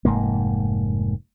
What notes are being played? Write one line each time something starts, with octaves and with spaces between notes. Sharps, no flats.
F1 G#2 A#3